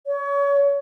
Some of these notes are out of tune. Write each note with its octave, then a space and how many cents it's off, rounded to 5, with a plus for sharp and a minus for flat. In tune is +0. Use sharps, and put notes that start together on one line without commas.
C#5 +30